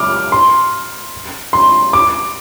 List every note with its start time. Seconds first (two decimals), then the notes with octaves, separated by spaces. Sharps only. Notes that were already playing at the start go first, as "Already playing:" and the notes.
Already playing: D6 F6
0.32 C6
1.53 C6
1.93 D6